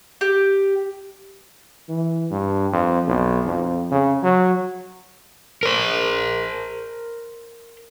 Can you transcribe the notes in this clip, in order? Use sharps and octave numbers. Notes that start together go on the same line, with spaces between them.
G4
E3
G2
F2
B1
F2
C#3
F#3
A#4 C5